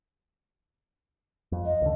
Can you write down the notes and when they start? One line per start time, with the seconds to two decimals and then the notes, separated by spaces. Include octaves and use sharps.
1.52 F2
1.65 D#5
1.82 C#2 D3